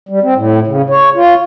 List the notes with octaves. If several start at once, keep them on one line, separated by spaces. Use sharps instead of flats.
G3
C4
A2
C#3
C#5
F4